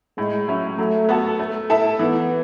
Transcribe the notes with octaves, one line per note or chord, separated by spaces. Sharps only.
A2 G#3
F#3 C#4 E4
F#3 A3
B3 F#4 A4
A3
E4 A4 E5
E3 B3